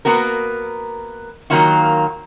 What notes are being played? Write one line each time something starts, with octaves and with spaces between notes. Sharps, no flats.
A#3 B3 F#4 A#4
D#3 F#3 A#3 F4 F#4